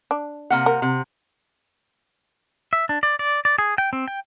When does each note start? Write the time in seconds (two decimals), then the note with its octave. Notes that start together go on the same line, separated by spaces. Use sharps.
0.11 D4
0.50 C3 A#3 F#5
0.66 A#4
0.82 C3
2.73 E5
2.89 D4
3.03 D5
3.19 D5
3.45 D5
3.58 G#4
3.78 G5
3.93 C4
4.08 G5